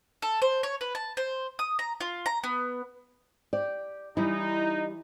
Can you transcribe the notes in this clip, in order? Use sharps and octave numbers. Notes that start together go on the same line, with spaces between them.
A4
C5
C#5
B4
A5
C5
D#6
A#5
F4
A#5
B3
G4 D5
E3 G3 D#4 E4